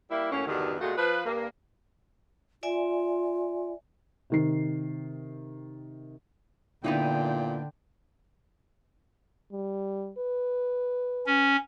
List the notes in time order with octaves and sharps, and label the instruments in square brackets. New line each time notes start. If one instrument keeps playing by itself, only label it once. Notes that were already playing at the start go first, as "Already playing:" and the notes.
[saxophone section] G3 A#3 E4
F#2 A2 A#3 C#4
E2 G2 B2 D3 D#3
A#2 G#3 A3 F4 F#4
F3 B4
G2 A#3
[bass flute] F4 [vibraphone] D5 E5 G#5
[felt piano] C3 D#3 C7
[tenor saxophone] A#2 [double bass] D3 [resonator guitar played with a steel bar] B3 D#4 E4 [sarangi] G5
[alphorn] G3
B4
[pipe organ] C#4